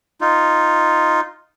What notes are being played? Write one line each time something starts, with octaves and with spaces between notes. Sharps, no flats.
D#4 F4